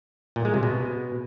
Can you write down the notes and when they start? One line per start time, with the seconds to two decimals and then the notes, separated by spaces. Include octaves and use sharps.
0.36 A#2
0.45 G#3
0.54 C3
0.63 B2